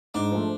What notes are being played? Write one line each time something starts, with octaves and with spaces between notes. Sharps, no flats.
G#2 D4
F3 A3